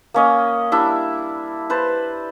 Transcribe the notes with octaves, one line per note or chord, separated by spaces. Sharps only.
A#3 C#4 D#5
G3 D4 E4 E5
B4 C5 A5